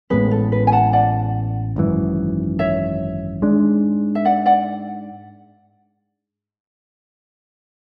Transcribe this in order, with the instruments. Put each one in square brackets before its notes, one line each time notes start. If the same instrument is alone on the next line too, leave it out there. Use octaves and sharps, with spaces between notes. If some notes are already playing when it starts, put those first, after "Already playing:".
[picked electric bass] A1 A2 G#3 B3 [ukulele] B4
[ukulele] A4
B4
G#5
F#5 A5
D5 F#5
[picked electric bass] G#1 F#2 E3
[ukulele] C#5 E5
[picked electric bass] G#2 G#3 D4
[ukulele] E5
D5 F#5
D5 F#5